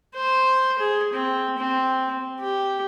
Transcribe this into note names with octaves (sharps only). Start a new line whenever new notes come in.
C5
G#4
C4
C4
G4